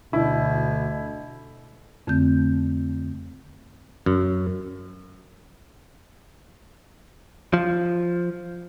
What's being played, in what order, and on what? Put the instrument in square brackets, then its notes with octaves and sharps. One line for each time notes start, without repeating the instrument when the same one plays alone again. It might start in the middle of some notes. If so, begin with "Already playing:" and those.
[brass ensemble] D2 D3 [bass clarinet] B2 [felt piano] E4
[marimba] F2 D3 A3 C4 G6
[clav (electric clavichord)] F#2
[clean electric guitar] F3